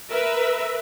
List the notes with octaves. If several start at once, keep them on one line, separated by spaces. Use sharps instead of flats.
A#4 B4 E5